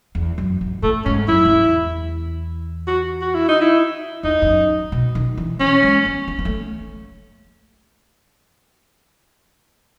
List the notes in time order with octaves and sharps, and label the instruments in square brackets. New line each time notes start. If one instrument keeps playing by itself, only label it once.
[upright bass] E2
F#2
G#2
[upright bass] A2 [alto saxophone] A3
[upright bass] G#2 [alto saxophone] C#4
[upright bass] F#2 [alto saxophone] E4
[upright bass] F#2
E2
[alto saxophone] F#4
F#4
E4
D#4
E4
[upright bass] E2 [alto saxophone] D#4
[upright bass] E2
F#2
B2
D#3
E3
[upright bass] E3 [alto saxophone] C#4
[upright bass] G#3
B3
B3
B3
A3